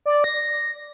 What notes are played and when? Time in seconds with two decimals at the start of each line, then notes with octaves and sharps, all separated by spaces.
0.06 D5
0.24 A#6